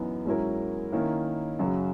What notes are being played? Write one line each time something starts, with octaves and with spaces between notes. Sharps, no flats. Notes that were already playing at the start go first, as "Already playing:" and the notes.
Already playing: F#2 E3 B3 D#4
G#2 F#3 C#4 E4 A#4
D#3 A#3 C#4 E4
F#2 C#3 F#3